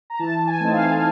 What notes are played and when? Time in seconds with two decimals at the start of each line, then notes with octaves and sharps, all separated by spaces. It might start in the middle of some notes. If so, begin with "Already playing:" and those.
0.10 A#5
0.19 E3 A5
0.47 G#5
0.60 A3 C4 D#4
0.73 F5